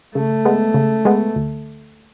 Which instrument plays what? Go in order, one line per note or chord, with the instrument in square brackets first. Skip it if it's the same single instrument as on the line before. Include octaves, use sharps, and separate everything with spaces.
[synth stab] C#3 [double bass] A3
[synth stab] G#3 B3
C#3
G#3 B3
D2